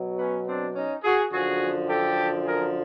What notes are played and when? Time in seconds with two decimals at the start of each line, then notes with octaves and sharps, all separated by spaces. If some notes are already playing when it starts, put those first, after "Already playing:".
Already playing: B2 F#3
0.18 B3 C#4
0.47 C4 D4
0.75 C#4 D#4
1.04 F#4 G#4
1.32 F#2 D3 F3 F#4 G#4
1.89 G4 A4
2.45 G#4 A#4